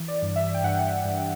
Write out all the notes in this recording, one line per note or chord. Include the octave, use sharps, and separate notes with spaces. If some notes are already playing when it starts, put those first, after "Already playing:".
Already playing: E3
D5
G2
E5
G5
G2 F#5
G2